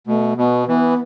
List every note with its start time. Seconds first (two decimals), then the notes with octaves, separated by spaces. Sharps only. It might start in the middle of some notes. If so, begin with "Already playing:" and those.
0.07 B2 A3
0.37 B2 B3
0.67 E3 B3